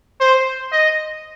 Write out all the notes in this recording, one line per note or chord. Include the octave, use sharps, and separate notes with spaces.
C5
D#5